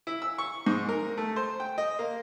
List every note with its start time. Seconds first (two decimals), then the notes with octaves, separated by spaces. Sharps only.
0.07 E4
0.22 E6
0.38 C#6
0.66 G#2
0.89 A#4
1.17 A3
1.36 C5
1.60 G5
1.78 D#5
1.99 A#3